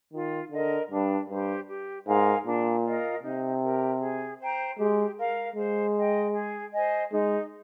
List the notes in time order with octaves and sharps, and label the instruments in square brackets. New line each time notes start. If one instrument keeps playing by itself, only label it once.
[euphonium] D#3 [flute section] F4
[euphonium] D3 [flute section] A#4 D#5
[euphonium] G2 [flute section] D4
[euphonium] G2 [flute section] G4 C5
[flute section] G4
[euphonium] G#2 [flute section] A#4 F5 G#5
[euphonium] A#2 [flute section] D4
[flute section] F4 A#4 D#5
[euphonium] C3 [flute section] D#4
[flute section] G4 A#4
G#4
C5 G5 A#5
[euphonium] G#3 [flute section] G4
[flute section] A#4 F5
[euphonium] G#3 [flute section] C5
[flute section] D#5 G5
G#4
C5 D#5 G#5
[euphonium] G#3 [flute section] D#4